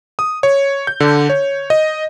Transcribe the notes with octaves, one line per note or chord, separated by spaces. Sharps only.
D#6
C#5
G6
D3
C#5
D#5